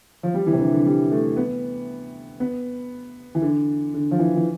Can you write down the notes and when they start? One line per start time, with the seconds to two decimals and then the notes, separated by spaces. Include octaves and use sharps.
0.23 F3
0.34 G3
0.46 E3
0.53 C3
0.59 D3
0.73 D3
0.86 G3
1.12 A3
1.37 B3
2.40 B3
3.35 E3
3.42 D3
3.94 D3
4.11 F3
4.19 E3
4.36 E3